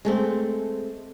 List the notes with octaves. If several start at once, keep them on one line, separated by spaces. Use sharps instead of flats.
G#3 A3 C4